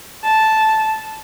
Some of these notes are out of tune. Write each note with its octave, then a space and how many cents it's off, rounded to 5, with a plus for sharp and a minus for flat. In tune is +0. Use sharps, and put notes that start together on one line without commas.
A5 -5